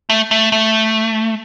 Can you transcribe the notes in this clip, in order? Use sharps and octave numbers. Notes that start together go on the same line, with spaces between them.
A3
A3
A3